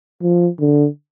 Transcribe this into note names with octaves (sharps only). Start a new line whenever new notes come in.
F3
D3